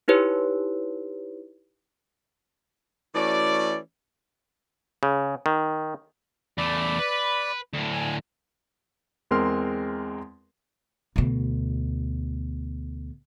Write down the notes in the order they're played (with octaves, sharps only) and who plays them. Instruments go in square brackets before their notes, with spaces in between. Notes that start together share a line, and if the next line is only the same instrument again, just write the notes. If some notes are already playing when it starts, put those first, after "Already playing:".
[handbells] D#4 E4 G4 B4 C#5
[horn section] E3 A3 C#4 F#4 D5
[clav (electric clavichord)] C#3
D#3
[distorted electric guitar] E2 A3 [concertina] D5 B5
[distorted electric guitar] B4
D2 A2
[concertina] G#5
[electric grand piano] E2 G#3 C4 A#4 C6 F6
[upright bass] D2 B2